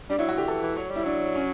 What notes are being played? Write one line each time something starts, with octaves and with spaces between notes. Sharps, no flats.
G3 D4
F#3 E4
F#4
D3 G4
E3 A4
E3
F#3 C#5
G3
E4
F#3 D4
C#4